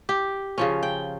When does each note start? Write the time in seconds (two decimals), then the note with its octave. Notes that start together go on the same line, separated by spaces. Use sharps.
0.09 G4
0.58 C#3 F3 C#4
0.83 G5